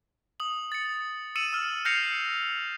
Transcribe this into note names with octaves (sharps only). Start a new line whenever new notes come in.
D#6 F#7
A6 C#7
E6 C#7 D#7 E7 F#7
E6 F6
F6 G6 A#6 C7 C#7 F7